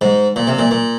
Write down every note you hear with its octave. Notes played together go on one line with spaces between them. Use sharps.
G#2
A#2
C3
A#2
A#2